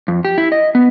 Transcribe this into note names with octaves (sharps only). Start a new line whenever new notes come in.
F2
G4
E4
D#5
B3